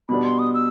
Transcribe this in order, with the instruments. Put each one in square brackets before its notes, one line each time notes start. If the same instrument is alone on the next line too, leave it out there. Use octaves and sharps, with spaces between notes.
[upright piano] B2 G3 B3 D4 [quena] B5
[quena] C6
D#6
E6